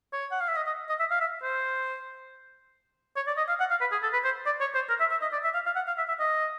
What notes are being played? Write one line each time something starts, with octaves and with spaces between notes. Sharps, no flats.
C#5
F#5
F5
E5
D#5
D#5
D#5
E5
F5
E5
C5
C#5
D5
D#5
F5
F#5
F5
B4
G#4
A4
B4
C5
D5
C#5
C5
A#4
E5
E5
D#5
D5
E5
F5
F5
F#5
F5
E5
E5
D#5